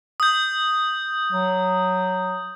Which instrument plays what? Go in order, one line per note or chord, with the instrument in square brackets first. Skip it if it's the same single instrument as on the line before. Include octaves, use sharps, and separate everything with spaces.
[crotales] D#6 G6
[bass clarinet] F#3